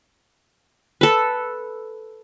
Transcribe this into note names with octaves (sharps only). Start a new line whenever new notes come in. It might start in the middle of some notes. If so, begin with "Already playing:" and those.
A4 B4